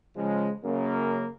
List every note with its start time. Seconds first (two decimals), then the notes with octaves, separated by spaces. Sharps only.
0.16 C#3 F3 G#3
0.64 F#2 C#3 A#3